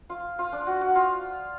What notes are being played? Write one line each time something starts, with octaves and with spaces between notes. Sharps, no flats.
F4
F4
D4
F#4
F#4
F4